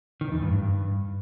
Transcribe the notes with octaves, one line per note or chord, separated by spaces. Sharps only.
D#3
E2
G2
G2